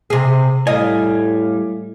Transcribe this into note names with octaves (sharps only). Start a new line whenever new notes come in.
C3 G#4
A2 G3 D#5 F5 G#5